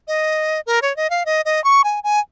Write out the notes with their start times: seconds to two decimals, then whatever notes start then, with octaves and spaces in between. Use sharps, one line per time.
0.08 D#5
0.66 A#4
0.82 C#5
0.96 D#5
1.10 F5
1.26 D#5
1.45 D#5
1.64 C#6
1.84 G#5
2.04 G#5